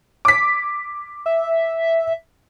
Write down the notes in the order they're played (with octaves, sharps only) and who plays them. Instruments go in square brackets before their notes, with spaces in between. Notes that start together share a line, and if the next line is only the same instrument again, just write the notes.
[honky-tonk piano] D6 B6
[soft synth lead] E5